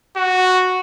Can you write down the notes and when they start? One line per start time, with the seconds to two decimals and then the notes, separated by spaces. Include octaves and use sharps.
0.17 F#4